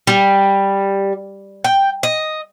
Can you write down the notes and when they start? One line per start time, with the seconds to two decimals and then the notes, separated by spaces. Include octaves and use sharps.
0.07 G3
1.64 G5
2.03 D#5